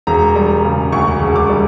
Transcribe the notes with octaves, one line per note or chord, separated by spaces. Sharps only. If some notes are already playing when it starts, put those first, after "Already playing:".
E1 A#5
G3
C#3
D2 C#6
E1
D6
G3